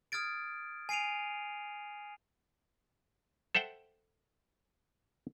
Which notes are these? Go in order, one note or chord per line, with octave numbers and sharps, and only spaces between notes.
D#6 F6 G#6 A6 D7
G#5 C7 D7 D#7 F7
A4 C5 E5 F#5 G5